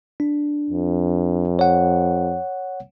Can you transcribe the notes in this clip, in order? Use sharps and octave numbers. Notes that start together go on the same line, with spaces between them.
D4
F2
C#5 F#5